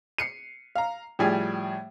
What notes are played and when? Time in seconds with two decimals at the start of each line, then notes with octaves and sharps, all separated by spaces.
0.18 C7 C#7 D#7
0.75 F5 A#5
1.19 A2 F3 G3 G#4 G5